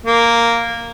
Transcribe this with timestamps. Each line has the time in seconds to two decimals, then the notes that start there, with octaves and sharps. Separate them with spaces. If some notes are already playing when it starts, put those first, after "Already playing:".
0.06 A#3